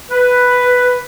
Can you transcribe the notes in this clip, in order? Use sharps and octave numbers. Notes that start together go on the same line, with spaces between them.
B4